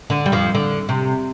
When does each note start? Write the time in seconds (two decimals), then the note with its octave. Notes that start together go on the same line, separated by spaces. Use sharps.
0.10 D3
0.26 G3
0.32 F2 F3
0.55 D3
0.89 C3